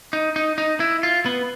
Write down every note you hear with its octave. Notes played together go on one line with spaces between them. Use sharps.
D#4
D#4
D#4
E4
F4
B3